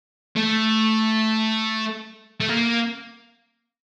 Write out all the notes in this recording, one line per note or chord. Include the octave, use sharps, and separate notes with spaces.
A3
A3
A#3